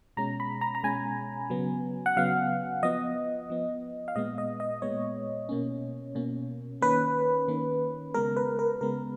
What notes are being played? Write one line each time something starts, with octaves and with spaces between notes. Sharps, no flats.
B2 G#3 C#4 A#5
B5
A#5
A#5
B2 G#3 C#4 G#5
C#3 F#3 B3
F#5
C#3 F#3 B3 F5
F3 B3 D#5
F3 B3
F5
A#2 G#3 B3 D#5
D#5
D#5
A#2 G#3 B3 C#5
B2 A#3 C#4
B2 A#3 C#4
D#3 A#3 C#4 B4
D#3 A#3 C#4
C#3 G#3 B3 A#4
B4
A#4
C#3 G#3 B3 A#4